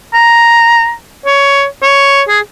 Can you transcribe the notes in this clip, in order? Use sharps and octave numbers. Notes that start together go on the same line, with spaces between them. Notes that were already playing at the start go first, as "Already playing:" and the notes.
A#5
C#5
C#5
G#4